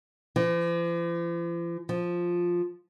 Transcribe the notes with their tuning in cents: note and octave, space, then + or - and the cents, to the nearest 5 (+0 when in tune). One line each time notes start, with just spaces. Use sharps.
F3 -45
F3 +5